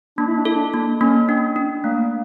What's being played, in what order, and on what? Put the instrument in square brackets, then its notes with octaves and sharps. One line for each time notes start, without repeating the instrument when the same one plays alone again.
[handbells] A#3 [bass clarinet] D4
[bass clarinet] E4
D4
[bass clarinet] E4 [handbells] A4
[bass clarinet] D4
[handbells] A#3
[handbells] A#3 [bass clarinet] C#4
[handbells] D4
D4
[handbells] A3 [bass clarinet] A#3